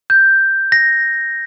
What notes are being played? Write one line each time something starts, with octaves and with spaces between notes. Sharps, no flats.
G6
A#6